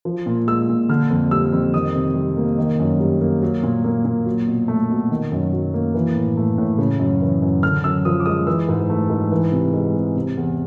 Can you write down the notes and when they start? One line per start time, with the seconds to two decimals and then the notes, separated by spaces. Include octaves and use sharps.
0.05 F3
0.26 A#2
0.48 G#3 E6
0.69 A#2
0.89 D3 F6
1.10 F2
1.31 G3 E6
1.52 F2
1.74 D#3 D#6
1.95 C3
2.15 G3
2.37 A#3
2.58 D#3
2.79 F#2
3.00 G3
3.21 A#3
3.42 F#3
3.63 A#2
3.84 A#3
4.05 A#2
4.26 F#3
4.48 B2
4.68 A3
4.90 B2
5.11 D#3
5.32 F#2
5.53 F#3
5.74 A#3
5.94 E3
6.15 A2
6.37 A3
6.58 A2
6.78 C#3
7.00 F#2
7.22 E3
7.42 F#2
7.63 D3 F6
7.84 F#2 E6
8.05 F3 D#6
8.20 D6
8.26 G#3 D#6
8.47 E3 E6
8.69 G#2
8.90 A3
9.10 G#2
9.32 E3
9.52 C3
9.74 G#3
9.95 C3
10.16 C3
10.37 E2